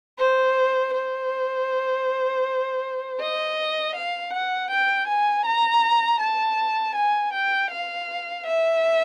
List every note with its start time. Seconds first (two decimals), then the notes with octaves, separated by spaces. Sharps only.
0.19 C5
0.94 C5
3.20 D#5
3.95 F5
4.33 F#5
4.71 G5
5.08 G#5
5.45 A#5
6.20 A5
6.95 G#5
7.33 G5
7.71 F5
8.46 E5